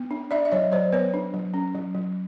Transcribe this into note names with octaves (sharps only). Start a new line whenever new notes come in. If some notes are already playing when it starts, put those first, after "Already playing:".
Already playing: B3
D4
D4 D5 E5
E5
F#3 C#5 D#5
F#3 C5 D5
B3 B4 C#5
D4
F#3
C#4
F#3
F#3